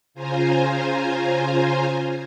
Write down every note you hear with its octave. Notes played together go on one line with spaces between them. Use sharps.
C#3 F4 C5 G#5 A#5